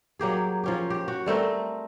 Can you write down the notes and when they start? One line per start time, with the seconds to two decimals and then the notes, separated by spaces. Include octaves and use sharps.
0.19 F#3 A#3 G4 G#4
0.64 F3 C#4 G4
0.90 G4
1.08 F#4
1.26 G3 A3 C4 A#4